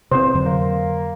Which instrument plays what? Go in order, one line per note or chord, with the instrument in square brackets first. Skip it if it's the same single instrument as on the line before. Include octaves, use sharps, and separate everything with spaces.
[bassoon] E2 [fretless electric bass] C3 C4 [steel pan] C5
[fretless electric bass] F2 D3 F#3
[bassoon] A#3